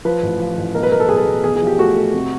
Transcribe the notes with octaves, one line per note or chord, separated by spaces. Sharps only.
F3 B4
A1
F3
A1
B1 A#4
B4
B1 A#4
A4
B1 G#4
A4
B2
E2 G#4
G#4
F3
G4
A3 F#4
A3
C3